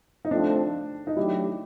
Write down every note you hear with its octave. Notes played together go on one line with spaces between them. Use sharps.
D#4
F3 A3 C4 D4 F4 A4
D#4
F#3 A3 D4 E4 G4